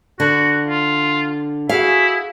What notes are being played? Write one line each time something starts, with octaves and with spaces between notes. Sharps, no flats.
D3 F#4
F4
E4 F#4 G#4 F5